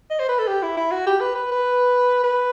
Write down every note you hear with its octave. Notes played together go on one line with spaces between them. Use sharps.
D#5
C5
B4
A4
G4
E4
E4
F#4
G4
B4
B4
B4
B4